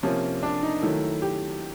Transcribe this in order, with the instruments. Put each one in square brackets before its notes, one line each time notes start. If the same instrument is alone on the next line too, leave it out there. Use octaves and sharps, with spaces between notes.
[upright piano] C3 F3 A#3 C#4
D4
D#4
D#3 F#3 A3 E4
G4